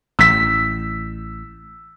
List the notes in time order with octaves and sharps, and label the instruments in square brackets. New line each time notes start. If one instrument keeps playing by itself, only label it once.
[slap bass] A1 [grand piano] E6 B6